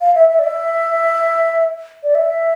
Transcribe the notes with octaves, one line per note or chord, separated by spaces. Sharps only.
F5
E5
E5
D5
E5
D5
E5